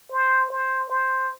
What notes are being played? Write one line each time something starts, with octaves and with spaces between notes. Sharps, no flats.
C5
C5
C5